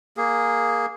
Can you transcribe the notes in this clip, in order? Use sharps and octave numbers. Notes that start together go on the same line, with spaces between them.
A#3 G#4